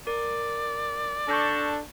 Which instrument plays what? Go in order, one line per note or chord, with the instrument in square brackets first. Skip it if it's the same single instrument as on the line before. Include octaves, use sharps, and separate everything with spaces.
[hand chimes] A#4 [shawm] D5
[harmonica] D4 A4 A5 [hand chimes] C#6 G6 A#6